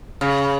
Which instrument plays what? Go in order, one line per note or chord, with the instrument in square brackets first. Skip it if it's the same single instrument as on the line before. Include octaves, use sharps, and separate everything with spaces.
[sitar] C#3